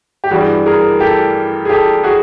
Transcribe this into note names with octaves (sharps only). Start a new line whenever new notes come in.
G4
G2 E3 G3 F#4 G#4
G#4 A#4
G4 A4
G#4
G4 A4
F#4 G#4